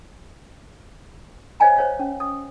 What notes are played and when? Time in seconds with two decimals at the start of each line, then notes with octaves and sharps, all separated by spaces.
1.60 C5 C#5 D#5 F5 G#5 A#5
1.77 C5 C#5 F5
1.99 C#4
2.20 D#6